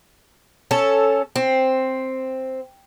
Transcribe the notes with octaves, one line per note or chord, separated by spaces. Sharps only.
C#4 A4
C4